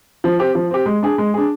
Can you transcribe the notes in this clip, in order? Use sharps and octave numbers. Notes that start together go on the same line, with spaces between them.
F3
C4 G4
F3
C4 G4
G#3
D4 G#4
G#3
D4 G#4